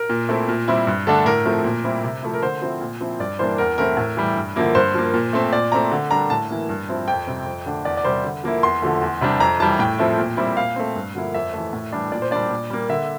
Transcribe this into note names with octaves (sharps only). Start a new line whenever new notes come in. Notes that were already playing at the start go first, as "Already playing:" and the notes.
Already playing: A#4
A#2
A3 C4 E4
A#2
G3 C4 E4
G2
D3 A3 D4 A4
A2 A#4
F3 A3 C4
A#2
G3 C4 E4
C3
F3 A3 E4
A#4
D3 C5
F3 C4 E4
A#2
F3 C4 E4
G2 D5
E3 G3 A#3 D4 C5
E2 A#4
E3 A3 C4 E4 A#4
A2
E3 G3
G2
D3 F3 A#3 E4
G2 C5
F3 A#3
A#2
A3 C4
A#2 D5
A3 C4 E4 A#5
D3
G3 D4 A#5
A2 A5
E3 A#3
G2
F3 C4 E4
F2 G5
C3 G3 C4
F2
D3 A3 D4
E2 D5
D5
C3 G3 C5
D3
F3 A#3 E4
E2 C6
D3 F3 A3
E2
C3 G3 D4
F2 A#5
E3 G3 A5
A2 G5
F3 A3 C4 E4
A#2
G3 C4 E4
A#2 F5
A3 C4
G2
D3 F3 A#3 E4
F2 E5
E3 A3
A2
E3 G3 D4
A#2 D5
C5
G3 D4 D5
A#2
G3 A#3
D3 E5